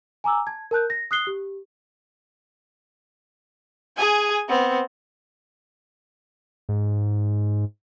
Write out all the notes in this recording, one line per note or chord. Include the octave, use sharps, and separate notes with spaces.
G#5 A#5 D6 E6
A5 G#6
A#4 A5 F#6 G6
A#6
D#6 F#6 C7 G7
G4
G#4 G#5
B3 C4
G#2